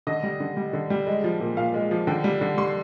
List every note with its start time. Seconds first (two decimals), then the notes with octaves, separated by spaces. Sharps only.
0.07 D3 D#5
0.23 G3
0.40 D3
0.57 G3
0.73 D3
0.90 G3
1.07 G#3
1.24 F3
1.40 A#2
1.57 A#2 F5
1.74 G#3
1.91 F3
2.07 D3 G5
2.24 G3
2.41 D3
2.57 G3 C6